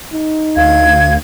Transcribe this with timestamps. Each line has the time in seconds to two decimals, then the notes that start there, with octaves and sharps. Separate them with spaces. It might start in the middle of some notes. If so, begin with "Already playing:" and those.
0.13 D#4
0.56 D2 F5 G#6